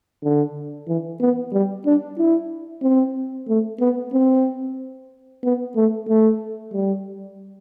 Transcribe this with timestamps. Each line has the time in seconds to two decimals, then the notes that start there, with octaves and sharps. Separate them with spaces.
0.23 D3
0.88 E3
1.21 B3
1.53 G3
1.86 D4
2.18 E4
2.83 C4
3.48 A3
3.80 B3
4.13 C4
5.43 B3
5.76 A3
6.08 A3
6.73 G3